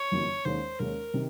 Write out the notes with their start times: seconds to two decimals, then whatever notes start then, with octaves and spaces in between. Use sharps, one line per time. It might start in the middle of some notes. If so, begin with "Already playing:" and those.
Already playing: C#5
0.11 F#1 F2 D#3 F#3 A#3
0.45 D#2 D#3 G#3 C#4 C5
0.79 D#2 D#3 G#3 C#4 A#4
1.14 C3 D#3